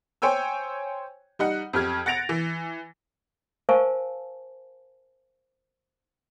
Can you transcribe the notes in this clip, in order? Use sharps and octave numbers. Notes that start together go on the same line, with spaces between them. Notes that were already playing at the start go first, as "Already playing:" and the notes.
C5 C#5 G5 G#5 E6
G3 D#4 F#5
F2 G4 F6 G#6
F#5 A6 A#6 D7 F7
E3
A#4 C5 F5 G#5 A5 C#6